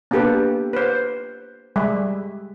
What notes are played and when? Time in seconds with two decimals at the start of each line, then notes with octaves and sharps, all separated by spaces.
0.11 A#3 B3 D4 G4 A4 B4
0.73 B4 C5
1.76 G3 G#3 E5